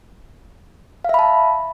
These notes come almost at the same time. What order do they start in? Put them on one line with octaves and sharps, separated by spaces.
F5 E5 B5 A5